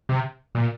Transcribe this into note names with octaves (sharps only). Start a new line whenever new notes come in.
C3
A#2